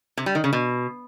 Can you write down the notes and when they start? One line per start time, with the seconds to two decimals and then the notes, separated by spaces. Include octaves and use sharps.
0.17 C3
0.26 G3
0.35 D#3
0.44 C#3
0.53 B2